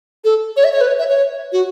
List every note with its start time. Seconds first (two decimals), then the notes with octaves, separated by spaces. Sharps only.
0.24 A4
0.57 C#5
0.64 E5
0.73 C#5
0.81 B4
0.88 C#5
0.99 E5
1.09 C#5
1.53 F#4